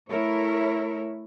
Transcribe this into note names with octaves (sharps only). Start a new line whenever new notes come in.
A3 E4 A#4 C#5